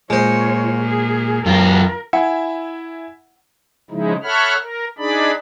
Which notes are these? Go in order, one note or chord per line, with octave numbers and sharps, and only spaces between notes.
A#2 G#3 F4 C5 C#5
G#4
F#2 F4 A#4
E4 E5 F#5 G#5
C#3 F3 G#3 D#4 E4
A4 C#5 E5 F#5 B5 F6
A#4
D4 D#4 G#4 D5 B5